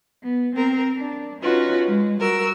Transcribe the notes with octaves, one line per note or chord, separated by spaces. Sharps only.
B3
C4 A#4
D4
C#4 D#4 F4 F#4 B4
G#3
G3 F#4 A#4 E6